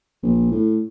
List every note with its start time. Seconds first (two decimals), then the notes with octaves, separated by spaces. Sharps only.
0.23 A#1
0.51 A2